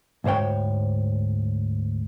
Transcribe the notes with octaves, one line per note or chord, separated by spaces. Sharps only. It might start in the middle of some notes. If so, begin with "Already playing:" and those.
D2 G#2 C5 C#5 G5